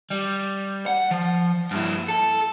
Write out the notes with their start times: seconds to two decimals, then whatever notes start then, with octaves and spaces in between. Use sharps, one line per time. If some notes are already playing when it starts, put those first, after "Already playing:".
0.11 G3
0.86 F#5
1.11 F3
1.71 G2 E4
2.08 A4